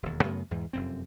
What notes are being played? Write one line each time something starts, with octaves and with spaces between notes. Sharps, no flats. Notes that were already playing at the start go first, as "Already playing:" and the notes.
E1 D#2
F#2 C#3 A3 B3
E2 G#2 E3
F1 F#2 C4